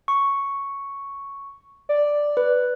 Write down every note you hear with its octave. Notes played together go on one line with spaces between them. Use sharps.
C#6
D5
B4